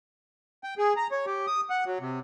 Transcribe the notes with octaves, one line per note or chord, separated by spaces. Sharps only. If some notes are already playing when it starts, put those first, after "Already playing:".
G5
G#4
A#5
C#5
G4
D#6
F#5
F#3
C3